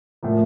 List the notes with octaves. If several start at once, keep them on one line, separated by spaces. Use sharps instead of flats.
A2 F3 A#3